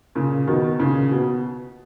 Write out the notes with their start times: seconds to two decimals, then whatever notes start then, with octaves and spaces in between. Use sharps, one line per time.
0.15 A#2 C#3
0.47 B2 D#3
0.79 A#2 C#3
1.11 B2